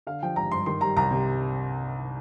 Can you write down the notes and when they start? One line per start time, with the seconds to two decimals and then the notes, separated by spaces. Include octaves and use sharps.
0.07 D3 F5
0.23 F3 G5
0.36 G#1 A#5
0.51 G2 C6
0.66 D#3 C6
0.81 G3 A#5
0.96 C2 A#5
1.11 C3